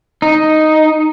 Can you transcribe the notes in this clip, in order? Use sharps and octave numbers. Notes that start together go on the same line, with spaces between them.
D#4